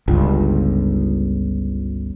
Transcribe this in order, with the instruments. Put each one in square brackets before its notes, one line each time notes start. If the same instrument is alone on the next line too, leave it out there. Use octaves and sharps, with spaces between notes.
[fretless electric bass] G1 C#2